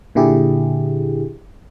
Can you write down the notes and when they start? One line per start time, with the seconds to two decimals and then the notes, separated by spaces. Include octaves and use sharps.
0.15 A#2 D3 E4 G4 G#4